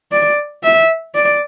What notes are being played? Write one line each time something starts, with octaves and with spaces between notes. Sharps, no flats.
D5
E5
D5